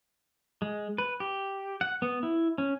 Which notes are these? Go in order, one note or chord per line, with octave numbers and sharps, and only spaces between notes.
G#3
B4
G4
F#5
B3
E4
C#4